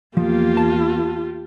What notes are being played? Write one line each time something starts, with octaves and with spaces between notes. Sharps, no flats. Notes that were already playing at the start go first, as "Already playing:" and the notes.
E2 F3 A#3 F4 G4
A5